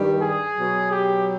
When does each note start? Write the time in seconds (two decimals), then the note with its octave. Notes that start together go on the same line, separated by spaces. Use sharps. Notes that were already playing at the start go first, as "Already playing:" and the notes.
Already playing: G2 D#3 G3
0.22 G#4
0.55 B2 F#3
0.90 G4